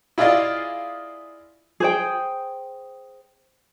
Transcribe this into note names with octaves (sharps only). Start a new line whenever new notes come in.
E4 F4 G#4 D5 D#5 F5
G#4 C5 G5